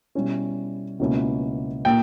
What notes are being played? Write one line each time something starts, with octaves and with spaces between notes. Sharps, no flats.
B2 G3 C#4 E4
C#2 B2 A#3 C#4 E4
A#2 A#3 G5